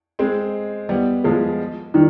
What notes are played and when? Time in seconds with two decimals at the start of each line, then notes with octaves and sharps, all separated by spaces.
0.19 G#3 C4
0.89 G3 B3
1.24 F3 G#3
1.94 D#3 G3